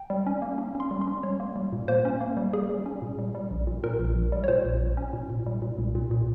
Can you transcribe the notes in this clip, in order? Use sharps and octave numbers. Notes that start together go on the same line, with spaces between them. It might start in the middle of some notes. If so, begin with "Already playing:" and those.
Already playing: G5
G3
C#4
A#3
C#4
C#4 C6
G3
C6
C#4
G3 C#5
A#3
G3
A#2
A#3 C5
C#4
A#3
G3
G3 G#4
G3
C#4
A#2
G3
G3
A#1
A#2
A#2 A#4
A#1
A#1
G3
C#5
A#2 C5
A#1
A#1
C#4
A#2
A#2
G3
A#2
C2
A#2
A#2